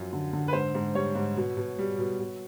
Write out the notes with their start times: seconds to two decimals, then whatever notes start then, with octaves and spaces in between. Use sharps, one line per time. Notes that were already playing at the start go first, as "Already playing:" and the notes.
Already playing: F#2 F3 F#3
0.13 D3
0.33 D3
0.48 B4
0.53 G#2 C5
0.75 G#2
0.95 G3 C#5
1.15 G#2
1.37 B2
1.57 B2
1.79 G3
1.98 B2
2.19 B2